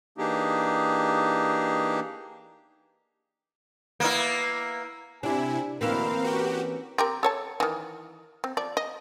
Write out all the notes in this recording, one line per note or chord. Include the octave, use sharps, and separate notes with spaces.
E3 A#3 D4 D#4 G4 G#4
A#3 B3 E4
C3 C4 D4 E4 G4 G#5
D2 B2 E3 A#3 C4 E4 A#4 F5
C4 C#4 F#4 G4 B4
C4 G4 A#4
A4 C#5 A5
D#3 E3
C4
F3 D5
D#5